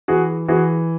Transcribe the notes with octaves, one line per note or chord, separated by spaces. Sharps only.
E3 F#4 G#4
E3 F#4 G#4